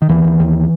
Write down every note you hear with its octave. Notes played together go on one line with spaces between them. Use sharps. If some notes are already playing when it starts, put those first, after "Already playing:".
D#3
D#2 E3
D#2
D#2